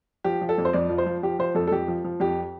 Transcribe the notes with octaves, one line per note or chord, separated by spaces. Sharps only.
F3 G4
F3
A4
F2
C5
F2 D5
F3
C5
F3
F3 G4
F3 C5
F2 A4
A4
F2 G4
F3
F3
F2 G4